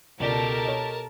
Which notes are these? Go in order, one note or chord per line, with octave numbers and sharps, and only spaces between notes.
C#2 B2 G4 A4 A#4 D5 A5 G7
C#5 D#5